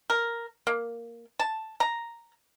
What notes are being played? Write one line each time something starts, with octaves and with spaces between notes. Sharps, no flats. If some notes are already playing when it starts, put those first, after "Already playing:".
A#4
A#3
A5
A#5